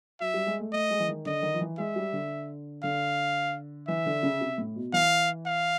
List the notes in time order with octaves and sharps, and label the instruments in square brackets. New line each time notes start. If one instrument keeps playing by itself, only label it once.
[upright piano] F#3 [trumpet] E5
[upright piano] G3
G#3
A3
[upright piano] A3 [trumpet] D#5
[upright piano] G#3
E3
D#3
[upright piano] D3 [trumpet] D#5
[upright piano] D#3
F3
E3
[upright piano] G#3 [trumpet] E5
[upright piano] G3
D3
[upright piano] D3 [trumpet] F5
[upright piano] E3 [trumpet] E5
[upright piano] D3
C#3
C3
A2
B2
[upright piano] E3 [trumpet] F5
[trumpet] F5